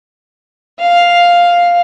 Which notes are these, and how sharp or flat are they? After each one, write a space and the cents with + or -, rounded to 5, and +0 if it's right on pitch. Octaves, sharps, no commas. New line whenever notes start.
F5 +0